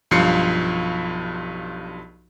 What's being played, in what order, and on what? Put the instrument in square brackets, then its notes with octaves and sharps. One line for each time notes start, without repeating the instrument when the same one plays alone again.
[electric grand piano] B1 G2 F3 C7 C#7